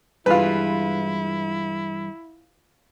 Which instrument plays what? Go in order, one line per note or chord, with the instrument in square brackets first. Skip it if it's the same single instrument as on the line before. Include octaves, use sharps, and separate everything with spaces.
[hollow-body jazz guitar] G2 E3 G#3 [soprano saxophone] E4 [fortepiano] F4 B4